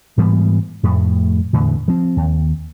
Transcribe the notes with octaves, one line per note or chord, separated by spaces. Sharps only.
G#2 E3 G3 B3
F2 A2 A3
E2 A2 D3
F3 C4
D#2